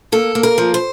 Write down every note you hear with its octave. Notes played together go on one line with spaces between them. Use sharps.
A#3 A4
A#3
A#4
F3
C5